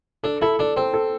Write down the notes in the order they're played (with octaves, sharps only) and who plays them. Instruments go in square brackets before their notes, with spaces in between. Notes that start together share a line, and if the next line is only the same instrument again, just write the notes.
[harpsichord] D4 [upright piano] A4
[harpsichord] E4 [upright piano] A4
[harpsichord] D4 [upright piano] A4
[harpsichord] C4 [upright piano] A4
[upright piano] A4